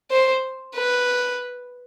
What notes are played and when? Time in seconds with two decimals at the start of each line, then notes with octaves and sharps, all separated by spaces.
0.11 C5
0.75 B4